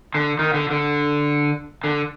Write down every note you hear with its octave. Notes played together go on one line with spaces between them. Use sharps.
D3
D#3
D3
D3
D3